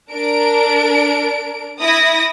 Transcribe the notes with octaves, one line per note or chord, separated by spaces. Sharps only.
D4 A#4 D7
E4 D#6 A#6